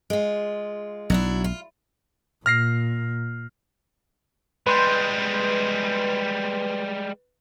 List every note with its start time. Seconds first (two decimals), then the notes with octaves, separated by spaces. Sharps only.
0.10 G#3 F4
1.10 B1 F#3 D4 E4
1.44 F4
2.46 A#2 F6 A#6 C7
4.67 G3 G#3 B4 C6 G6